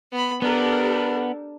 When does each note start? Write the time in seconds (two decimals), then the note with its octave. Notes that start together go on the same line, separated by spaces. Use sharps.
0.12 B3 B5
0.42 B3 D4 G4 A4 A#4